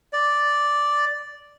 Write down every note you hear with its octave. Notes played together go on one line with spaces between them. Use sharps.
D5